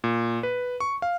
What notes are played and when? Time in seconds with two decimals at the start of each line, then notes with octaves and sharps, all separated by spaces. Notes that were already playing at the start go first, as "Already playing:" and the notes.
0.04 A#2
0.43 B4
0.80 C#6
1.02 F5